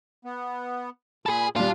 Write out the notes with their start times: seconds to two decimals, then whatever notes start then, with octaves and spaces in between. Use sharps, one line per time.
0.25 B3
1.26 A#2 G#4 A4 B5
1.56 A#2 G3 D4 F4